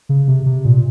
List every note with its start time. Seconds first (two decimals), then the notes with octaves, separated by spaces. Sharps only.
0.09 C#3
0.28 C3
0.46 C3
0.65 A#2